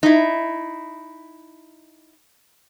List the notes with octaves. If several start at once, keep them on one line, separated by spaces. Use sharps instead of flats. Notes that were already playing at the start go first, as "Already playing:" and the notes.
D#4 E4